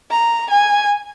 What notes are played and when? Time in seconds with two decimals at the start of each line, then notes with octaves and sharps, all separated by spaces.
0.10 A#5
0.50 G#5